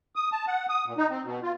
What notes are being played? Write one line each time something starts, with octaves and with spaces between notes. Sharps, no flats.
D#6
A5
F#5
D#6
A#2
D#4
C4
B2
F4